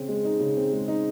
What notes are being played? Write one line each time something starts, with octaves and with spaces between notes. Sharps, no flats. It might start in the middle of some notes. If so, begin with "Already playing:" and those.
Already playing: C#3 C4
G#3
D#4
C#3
C4
G#3
D#4